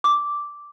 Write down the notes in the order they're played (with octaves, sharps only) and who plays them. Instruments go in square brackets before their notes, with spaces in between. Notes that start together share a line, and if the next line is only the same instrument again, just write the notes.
[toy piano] D6